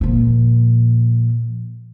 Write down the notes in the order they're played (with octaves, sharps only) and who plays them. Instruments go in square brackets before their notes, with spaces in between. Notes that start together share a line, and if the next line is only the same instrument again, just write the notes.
[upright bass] A#2 F3